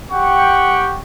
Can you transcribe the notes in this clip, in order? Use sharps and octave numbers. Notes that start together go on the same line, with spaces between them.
G4 F#5 G5 C#6